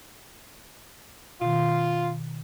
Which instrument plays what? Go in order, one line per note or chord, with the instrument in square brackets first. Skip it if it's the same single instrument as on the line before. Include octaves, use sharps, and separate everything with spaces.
[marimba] B2 D#3 [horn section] F4